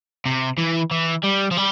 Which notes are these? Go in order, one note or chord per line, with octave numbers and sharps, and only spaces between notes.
C3
E3
E3
G3
F3
G3